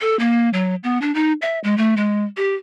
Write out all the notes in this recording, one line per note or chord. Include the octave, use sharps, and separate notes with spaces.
A4
A#3
F#3
B3
D4
D#4
E5
G#3
A3
G#3
G4